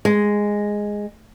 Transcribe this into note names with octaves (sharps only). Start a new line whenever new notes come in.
G#3